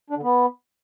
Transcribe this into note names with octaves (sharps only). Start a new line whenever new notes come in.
D4
D3
B3